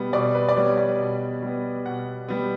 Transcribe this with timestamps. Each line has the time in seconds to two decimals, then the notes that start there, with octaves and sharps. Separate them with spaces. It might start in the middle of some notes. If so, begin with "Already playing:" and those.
Already playing: B2 G3 B3
0.13 B2 D5
0.35 B4
0.49 D5
0.56 G3 B3 C#5
0.70 C#5
0.78 D5
0.99 B2
1.43 G3 B3
1.86 B2 F#5
2.29 G3 B3